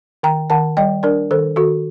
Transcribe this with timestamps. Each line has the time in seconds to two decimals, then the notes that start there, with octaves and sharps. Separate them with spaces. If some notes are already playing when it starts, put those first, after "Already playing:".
0.23 D#3 G5 A#5
0.50 D#3 F#5 A5
0.77 G3 D#5 G5
1.03 D4 A#4 D5
1.31 D#3 A4 C5
1.56 D#3 F#4 A4